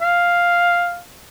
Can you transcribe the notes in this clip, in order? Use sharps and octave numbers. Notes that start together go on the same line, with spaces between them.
F5